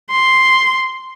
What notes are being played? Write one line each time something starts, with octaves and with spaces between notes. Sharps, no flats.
C6